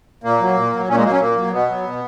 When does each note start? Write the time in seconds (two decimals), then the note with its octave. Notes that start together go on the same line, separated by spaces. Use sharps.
0.24 A#2 A#3
0.40 F#3
0.56 A#2
0.73 F#3
0.88 A#2 C#4
0.97 G#3
1.04 F#3 A#3
1.12 C#4
1.20 A#2 A#3
1.36 F#3
1.52 B2 B3
1.69 F#3
1.84 B2